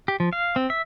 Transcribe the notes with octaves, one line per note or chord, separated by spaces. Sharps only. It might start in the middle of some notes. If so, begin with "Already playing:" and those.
G4
F3
F5
C4
E5